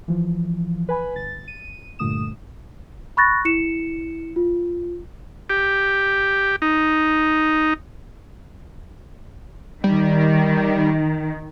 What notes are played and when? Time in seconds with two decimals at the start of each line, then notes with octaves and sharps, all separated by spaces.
0.08 E3 F3
0.89 B4 G#5 B5
1.15 G1 A6
1.48 D#7
1.99 G2 A#2 D3 A3 D#6 E7
3.17 B5 C#6 F#6 A6 A#6
3.45 E4 C#7 E7
4.36 F4
5.50 G4
6.62 D#4
9.84 D#3 G3